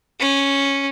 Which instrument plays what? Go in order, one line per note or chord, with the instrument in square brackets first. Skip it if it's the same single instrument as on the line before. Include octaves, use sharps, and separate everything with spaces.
[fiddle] C#4